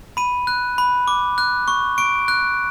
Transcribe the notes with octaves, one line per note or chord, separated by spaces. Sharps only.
B5 D#7
F#6
B5
D6
F#6
C#6
C#6 D7
F#6